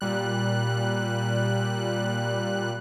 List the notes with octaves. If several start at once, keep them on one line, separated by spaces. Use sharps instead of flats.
A#2 G3 F#6